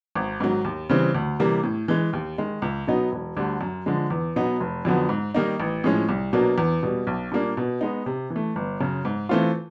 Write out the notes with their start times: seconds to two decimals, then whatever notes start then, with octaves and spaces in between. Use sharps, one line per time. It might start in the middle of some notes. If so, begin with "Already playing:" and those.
0.15 G#1
0.40 G#2 D#3 F#3
0.64 D#2
0.89 C#3 E3 G3 C4
1.15 D2
1.39 C3 E3 G3 A#3
1.63 A2
1.88 E3 G#3
2.13 D#2
2.38 D#3 G#3
2.62 C#2
2.87 B2 F#3 B3 D#4
3.12 E1
3.37 D2 D3 G3
3.61 F#2
3.86 D3 F3 G#3
4.10 E2
4.36 B2 F#3 B3 D#4
4.60 F1
4.85 F2 D3 F#3 B3
5.09 G#2
5.34 D#3 G3 A#3 D#4
5.60 A1
5.84 A2 F3 G#3 C#4
6.09 C2
6.33 B2 F#3 A#3 D4
6.58 E2
6.83 B2 G3
7.07 B1
7.32 A#2 G3 A#3 D4
7.57 B2
7.81 G#3 B3 D#4
8.06 C3
8.30 E3
8.36 A3
8.56 G1
8.80 F#2 C#3
9.05 G#2
9.29 E3 A3 C4 F4